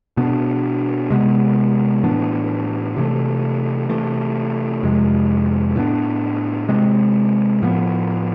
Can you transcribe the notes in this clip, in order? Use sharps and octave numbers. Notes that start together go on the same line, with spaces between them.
B2 B3 D4
C3 G#3 B3
A2 E3 B3 D4
C3 E3 A3
C3 E3 A3
F2 C3 G#3
A2 F3 B3 D4
C3 G#3 C4
A2 F3 B3